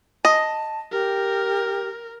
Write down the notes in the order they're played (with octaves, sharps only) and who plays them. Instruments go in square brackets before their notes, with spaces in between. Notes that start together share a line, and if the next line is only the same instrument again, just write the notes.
[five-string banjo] D#5 [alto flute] A5
[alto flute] G4 [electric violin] A#4